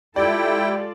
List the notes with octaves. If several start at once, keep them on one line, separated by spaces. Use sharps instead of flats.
G#3 E4 F4 G4 A4 D5 G5